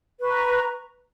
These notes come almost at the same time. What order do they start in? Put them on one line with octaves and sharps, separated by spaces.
B4 C#6 A#5